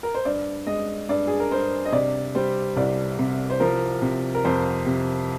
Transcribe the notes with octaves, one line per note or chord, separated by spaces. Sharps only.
A#4
C5
G2 D5
G#3 D#5
G2 D5
G#4
A#4
G2 C5
D#5
C3 D5
G3 C5
C2 D5
C3
C5
F3 A#4
C3
A#4
F2 C5
C3